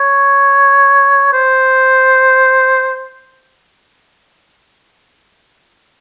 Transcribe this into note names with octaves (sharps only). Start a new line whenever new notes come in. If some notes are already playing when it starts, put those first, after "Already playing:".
Already playing: C#5
C5